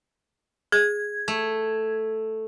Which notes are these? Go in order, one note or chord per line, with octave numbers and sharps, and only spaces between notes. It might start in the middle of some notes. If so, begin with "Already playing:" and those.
G#4 G#6
A3